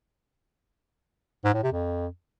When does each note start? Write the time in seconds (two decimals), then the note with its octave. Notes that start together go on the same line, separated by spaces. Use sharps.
1.45 G#2
1.54 A2
1.63 C3
1.73 F2